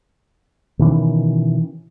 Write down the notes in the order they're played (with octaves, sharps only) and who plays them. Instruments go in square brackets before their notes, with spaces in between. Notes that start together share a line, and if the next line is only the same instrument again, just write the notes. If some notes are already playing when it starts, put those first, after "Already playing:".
[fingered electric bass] B2 D#3 E3 C#4